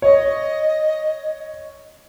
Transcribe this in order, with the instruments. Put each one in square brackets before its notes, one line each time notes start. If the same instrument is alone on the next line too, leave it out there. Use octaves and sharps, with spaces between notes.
[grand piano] C#5 [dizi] D#5